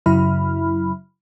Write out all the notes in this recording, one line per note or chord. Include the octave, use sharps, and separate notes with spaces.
F#2 C#3 F#3 E4 B5 F6